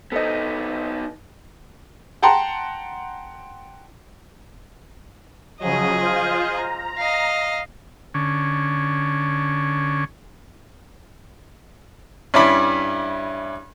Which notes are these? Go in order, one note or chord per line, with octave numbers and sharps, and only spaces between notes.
B3 D#4 A4 C5 D#5
F#5 G5 A5 A#5 C6
C#3 F3 F#3 G#4 D#5
F4 C5 F5
A#5
D#5 F5
D3 C#4
G2 C#4 E4 D5 B5